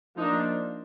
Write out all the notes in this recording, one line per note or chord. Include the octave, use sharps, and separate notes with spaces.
F3 A#3 D4 D#4